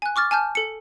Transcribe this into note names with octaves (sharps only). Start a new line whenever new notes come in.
G#5 F#6
C#6 D6 F6 A6
G#5 A5 F6 G6
A4 C#7